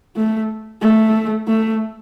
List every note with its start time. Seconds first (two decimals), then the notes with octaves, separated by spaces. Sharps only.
0.17 A3
0.82 A3
1.48 A3